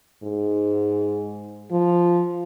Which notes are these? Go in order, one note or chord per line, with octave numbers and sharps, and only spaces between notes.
G#2
F3